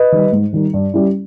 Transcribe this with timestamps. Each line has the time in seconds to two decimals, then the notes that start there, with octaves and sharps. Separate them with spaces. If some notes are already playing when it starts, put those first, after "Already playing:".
Already playing: B4 D#5
0.12 D#3 G3
0.32 G#2
0.53 D#3 G3
0.74 G2
0.94 G3 C#4 E4